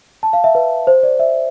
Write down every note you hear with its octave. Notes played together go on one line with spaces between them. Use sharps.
A5
F5
E5
B4
C5
D5
E5